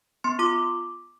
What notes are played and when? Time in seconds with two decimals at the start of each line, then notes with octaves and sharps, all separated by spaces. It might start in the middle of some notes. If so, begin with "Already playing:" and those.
0.24 B3 C6
0.39 F4 D6